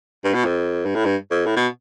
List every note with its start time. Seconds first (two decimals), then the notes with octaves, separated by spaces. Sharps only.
0.24 G2
0.34 B2
0.44 F2
0.85 G2
0.95 A2
1.05 G2
1.31 F2
1.46 A2
1.56 B2